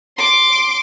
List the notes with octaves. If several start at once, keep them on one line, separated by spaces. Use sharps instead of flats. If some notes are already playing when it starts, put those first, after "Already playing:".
C6 D6